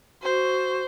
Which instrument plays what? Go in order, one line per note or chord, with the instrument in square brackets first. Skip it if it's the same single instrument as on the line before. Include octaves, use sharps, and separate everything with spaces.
[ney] F#4 [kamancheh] C5